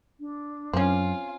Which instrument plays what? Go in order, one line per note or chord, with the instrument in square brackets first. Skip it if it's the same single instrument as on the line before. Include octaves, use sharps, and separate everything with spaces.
[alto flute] D4
[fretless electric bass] F#2 [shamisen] C4 C#4 [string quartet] F4 G#5